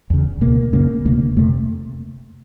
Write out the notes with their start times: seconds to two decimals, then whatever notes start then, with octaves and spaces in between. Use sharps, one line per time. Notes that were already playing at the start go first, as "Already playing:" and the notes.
0.10 E2 C#3
0.41 B2 A#3
0.47 C#2
0.73 F#2 C#3 A#3
1.05 D2 C3 A#3
1.36 F2 C3 A3